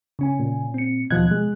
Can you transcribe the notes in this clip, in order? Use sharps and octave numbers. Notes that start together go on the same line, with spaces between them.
C#3 C#4 G#5
A#2
C4 C#7
D#2 B2 F3 D#5 F#6 G#6
G#3